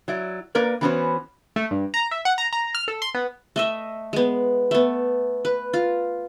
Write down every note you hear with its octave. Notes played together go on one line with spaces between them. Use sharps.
F#3 E4 D5
A#3 A#4 B4 D5
E3 A3 B3 C#4 F#4 C5
A3
G2
A#5
E5
F#5
A#5
A#5
F6
A4
C6
B3
A3 D#5 E5
G#3 B3
A3 B3
B4
F4